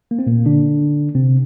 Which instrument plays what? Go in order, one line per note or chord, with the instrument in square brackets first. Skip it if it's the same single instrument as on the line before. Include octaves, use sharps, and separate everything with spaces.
[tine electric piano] A#3
C4
A#2 A#3
D3 D4
C3 C4